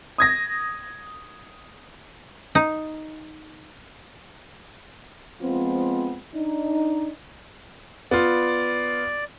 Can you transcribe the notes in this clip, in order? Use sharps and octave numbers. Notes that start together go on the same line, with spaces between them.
D#6 G#6 A#6
D#4
F3 G#3 B3 C4 F4
D4 D#4
B3 F4 D5